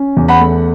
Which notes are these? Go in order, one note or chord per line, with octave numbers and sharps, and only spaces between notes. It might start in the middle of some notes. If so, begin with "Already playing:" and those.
Already playing: C#4
E2
F#5 B5
A3